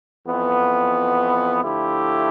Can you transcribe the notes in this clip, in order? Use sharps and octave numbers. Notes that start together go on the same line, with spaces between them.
F2 E3 B3
D3 F3 A3 E4 G4